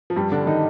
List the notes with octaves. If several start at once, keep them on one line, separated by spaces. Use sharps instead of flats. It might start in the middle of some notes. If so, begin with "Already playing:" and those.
F3
G2 G3
D3 D4
D#3 D#4